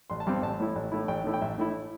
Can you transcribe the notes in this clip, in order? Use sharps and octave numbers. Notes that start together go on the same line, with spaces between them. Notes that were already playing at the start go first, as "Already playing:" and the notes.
A1 C6
A5
G2 G3 C4
A1 A5
A2 A3 E4
A1
A2 A3 E4
A1 G5
A2 A3 E4
G5
A1 E5
A2 A3 E4